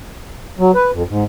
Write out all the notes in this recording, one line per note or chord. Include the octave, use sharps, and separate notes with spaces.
F#3
B4
F2
G#2